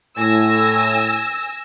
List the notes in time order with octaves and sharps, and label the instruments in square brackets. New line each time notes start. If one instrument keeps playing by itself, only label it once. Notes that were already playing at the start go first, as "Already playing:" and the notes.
[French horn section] A2 [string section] G#5 E6 A#6